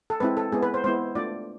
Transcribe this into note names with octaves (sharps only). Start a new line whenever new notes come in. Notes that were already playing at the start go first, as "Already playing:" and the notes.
A4
G#3 C4 E4 B4
A4
G#3 B3 E4 G#4
B4
C5
G#3 B3 E4 C5
A3 D4 F4 D5